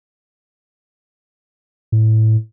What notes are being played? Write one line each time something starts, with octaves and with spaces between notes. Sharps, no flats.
A2